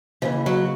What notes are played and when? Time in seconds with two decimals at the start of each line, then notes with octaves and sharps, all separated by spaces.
0.22 D#2 C#3 E3 F3
0.46 F#3